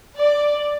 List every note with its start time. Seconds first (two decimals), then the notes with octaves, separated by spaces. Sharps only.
0.17 D5